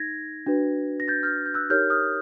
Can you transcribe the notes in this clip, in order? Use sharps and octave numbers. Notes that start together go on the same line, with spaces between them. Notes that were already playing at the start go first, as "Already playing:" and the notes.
Already playing: D#4 G#6 A#6
D4 F#4 B4
A#6
G6 A6
F6 G6
G6
E6 F#6
D#4 G4 A#4 C#5 F6 G6
D#6 F6